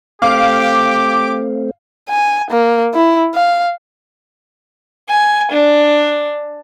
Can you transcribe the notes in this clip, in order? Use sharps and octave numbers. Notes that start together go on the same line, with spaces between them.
A3 C4 G4 F5 D6
G#5
A#3
E4
F5
G#5
D4